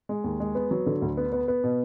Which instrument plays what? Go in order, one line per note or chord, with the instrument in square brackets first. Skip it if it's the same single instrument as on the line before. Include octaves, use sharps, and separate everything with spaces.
[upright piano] G#3
D#2
G#3
B3
F#3
D3
D2
B3
B3
B3
B2